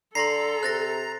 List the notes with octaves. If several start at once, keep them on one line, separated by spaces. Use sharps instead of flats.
D3 A4 A#5 C6 A#6 C7
C3 F#6 A6 A#6